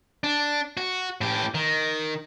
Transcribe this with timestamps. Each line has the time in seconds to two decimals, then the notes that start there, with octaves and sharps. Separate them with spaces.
0.24 D4
0.77 F#4
1.21 A2 G4
1.54 D#3